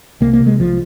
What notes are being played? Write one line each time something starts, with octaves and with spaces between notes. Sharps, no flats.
C2 A#3
A#3
C3
G#3
C2 F3